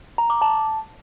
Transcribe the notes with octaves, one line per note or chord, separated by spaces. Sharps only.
A#5
D6
A5